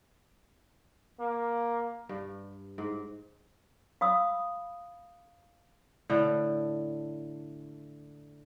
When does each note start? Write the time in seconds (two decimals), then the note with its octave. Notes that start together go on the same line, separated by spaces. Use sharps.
1.20 A#3
2.09 G2
2.78 G#2
4.01 F5 B5 D#6 E6
6.10 A2 D3